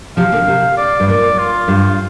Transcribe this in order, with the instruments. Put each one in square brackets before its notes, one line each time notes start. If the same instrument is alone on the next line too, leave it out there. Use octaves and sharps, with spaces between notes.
[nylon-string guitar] C3 F3 [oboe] F5
[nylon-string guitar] A#2 D3
C3
[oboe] D5
[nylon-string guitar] G2
[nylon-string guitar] A#2 [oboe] D5
[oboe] F4
[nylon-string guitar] G2